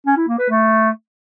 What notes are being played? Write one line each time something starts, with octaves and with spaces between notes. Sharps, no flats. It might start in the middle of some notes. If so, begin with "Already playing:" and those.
C#4
E4
A#3
B4
A3